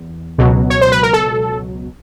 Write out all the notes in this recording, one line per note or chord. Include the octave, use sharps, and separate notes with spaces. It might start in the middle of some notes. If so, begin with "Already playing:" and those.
Already playing: E2
C#2 B2 F#3
C#5
C5
B4
A#4
A4